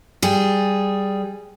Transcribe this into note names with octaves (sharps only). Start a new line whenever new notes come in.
G3 G#4